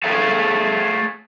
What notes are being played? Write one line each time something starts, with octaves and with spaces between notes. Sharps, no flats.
A3 G#4 A4 C#5 E5 F5